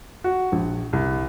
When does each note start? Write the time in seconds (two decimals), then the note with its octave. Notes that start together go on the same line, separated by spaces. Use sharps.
0.24 F#4
0.52 A#1
0.93 C2